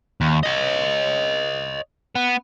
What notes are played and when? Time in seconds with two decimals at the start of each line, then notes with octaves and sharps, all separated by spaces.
0.21 D#2
0.43 C#5 D#5
2.15 B3